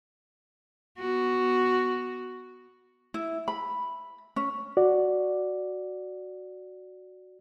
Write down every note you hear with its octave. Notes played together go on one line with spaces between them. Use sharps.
B3 F#4
E4
B5
C#4
F#4 D5